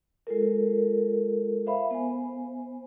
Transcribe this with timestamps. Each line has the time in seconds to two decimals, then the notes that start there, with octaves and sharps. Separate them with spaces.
0.27 G#3 F4 A4 A#4
1.66 C5 E5 F5 B5
1.91 B3 C5 G#5